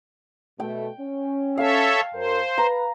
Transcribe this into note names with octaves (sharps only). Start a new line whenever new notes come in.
B2 A3 G5
C#4
A4 C#5 E5 F5 A5
F#2 A#4 C5
B4 A#5